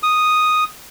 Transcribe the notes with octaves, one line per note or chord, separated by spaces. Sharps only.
D#6